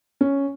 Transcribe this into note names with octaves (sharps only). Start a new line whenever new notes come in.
C#4